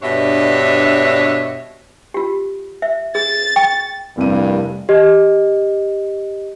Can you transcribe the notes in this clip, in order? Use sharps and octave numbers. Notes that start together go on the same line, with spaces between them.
G2 B2 D4 C#5 D5 E5
F4 G4
E5
G#4 A6
G5 C#6
F1 G2 C3 G3 A#3 E4 D#7
G4 D#5